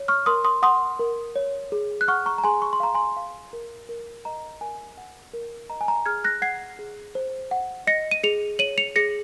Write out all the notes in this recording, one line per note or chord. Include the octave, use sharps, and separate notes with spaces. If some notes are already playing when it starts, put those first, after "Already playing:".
Already playing: C#5
C#6 F6
A#4 C6 D#6
C6 D#6
F#5 C6 D#6
A#4
C#5
G#4
F#6
F#5 C#6 F6
A#5 C#6
A#5
G#4 G#5 C6
C#6
C6
F5 A#5
G#5 C6
F5
A#4
A#4
D#5 A#5
A#4 G#5
F#5
A#4
D#5 A#5
G#5
A#5
G#4 F6 G#6
F#6 A#6
F#5 G#6 C7
G#4
C5
F#5
D#5 A#6 C#7
D#7
G#4 C#7 F7
C#5 D#7 F#7
C#7 F7
G#4 A#6 C#7